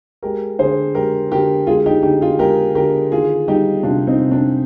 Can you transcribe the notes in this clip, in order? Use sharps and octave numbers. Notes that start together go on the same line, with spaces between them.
G#3 G4 A#4
D3 G#4 C5
G#3 G4 A#4
D3 G4 A#4
G#3 F4 G#4
D#4 G4
D3 D#4 G4
F4 G#4
G#3 G4 A#4
D3 G4 A#4
D#3 F4 G#4
G3 D#4 G4
C3 D4 F4
C4 D#4
C3
D4